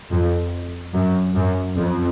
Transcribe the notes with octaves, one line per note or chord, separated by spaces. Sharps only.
F2
F#2
F#2
F2